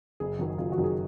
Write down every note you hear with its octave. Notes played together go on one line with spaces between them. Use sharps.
F#1 G#4
F#2 D#3 F#3
F#1 F4
F#4
F#2 D#3 F#3
G#4